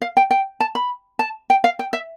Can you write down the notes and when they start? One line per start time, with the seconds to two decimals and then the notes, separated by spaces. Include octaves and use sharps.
0.02 F5
0.17 G5
0.31 G5
0.60 A5
0.75 B5
1.19 A5
1.50 G5
1.64 F5
1.79 G5
1.93 E5